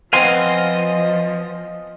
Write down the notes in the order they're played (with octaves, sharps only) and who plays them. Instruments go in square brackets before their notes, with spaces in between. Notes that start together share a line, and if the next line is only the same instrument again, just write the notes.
[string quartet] F3 [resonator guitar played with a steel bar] B3 C4 [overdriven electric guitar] D#5 [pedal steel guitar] F5 G#5 C6